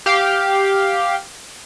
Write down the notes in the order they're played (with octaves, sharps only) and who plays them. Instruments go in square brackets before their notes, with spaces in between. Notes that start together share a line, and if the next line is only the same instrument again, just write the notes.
[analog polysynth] G4 F5